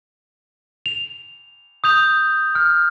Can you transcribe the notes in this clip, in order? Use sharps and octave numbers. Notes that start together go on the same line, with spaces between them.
F7
D#6 G6 F7
F6